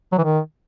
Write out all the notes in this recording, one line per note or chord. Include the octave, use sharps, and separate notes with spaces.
F#3
E3
D#3